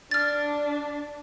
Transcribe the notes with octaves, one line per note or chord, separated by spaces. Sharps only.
D4 F6 A6